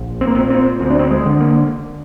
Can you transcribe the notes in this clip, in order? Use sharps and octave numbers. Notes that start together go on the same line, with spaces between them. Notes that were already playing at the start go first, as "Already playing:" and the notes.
Already playing: A#1
C4
A#3
A#2 C4
C4
D2 C4
D4
C4
G#3
D3
A#3